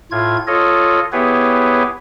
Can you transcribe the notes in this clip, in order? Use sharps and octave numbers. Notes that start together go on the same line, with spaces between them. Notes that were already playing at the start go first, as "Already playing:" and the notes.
A2 F4 G#6
F4 A4 C#5 D#5
B3 E4 G4 G#4 B4 C#5